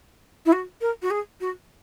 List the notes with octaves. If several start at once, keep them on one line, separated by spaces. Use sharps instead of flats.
E4
F#4
A#4
F#4
G#4
F#4